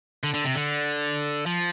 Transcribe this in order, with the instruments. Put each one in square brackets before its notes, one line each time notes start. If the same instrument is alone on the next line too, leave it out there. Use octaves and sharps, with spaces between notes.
[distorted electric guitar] D3
D3
C3
D3
F3